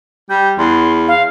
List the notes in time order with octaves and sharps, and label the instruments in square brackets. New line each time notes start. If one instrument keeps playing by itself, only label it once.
[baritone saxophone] G3 [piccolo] G6
[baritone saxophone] E2 [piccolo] C6
[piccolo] F5